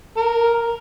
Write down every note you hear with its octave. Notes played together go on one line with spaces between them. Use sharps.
A#4